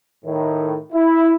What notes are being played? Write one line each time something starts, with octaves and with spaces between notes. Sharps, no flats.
A2 D#3
E4